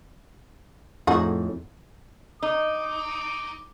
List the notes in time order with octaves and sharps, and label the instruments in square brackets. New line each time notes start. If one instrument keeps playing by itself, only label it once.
[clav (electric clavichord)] F2 A2 [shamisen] D#4 F#4 G#4
[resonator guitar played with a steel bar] D#4 [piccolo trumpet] D6